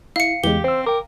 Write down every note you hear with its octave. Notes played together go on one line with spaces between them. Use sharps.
E4 F5 C#7
E2 C#3 E3 G#3 G4 G7
C4 C5 E6
A#4 G5 D6